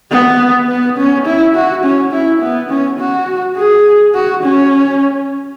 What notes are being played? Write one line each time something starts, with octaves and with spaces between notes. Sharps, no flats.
B3
B3
C#4
E4
F#4
C#4
E4
B3
C#4
F#4
G#4
F#4
C#4